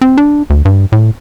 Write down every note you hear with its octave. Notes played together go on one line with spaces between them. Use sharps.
C4
D4
D2
G2
A2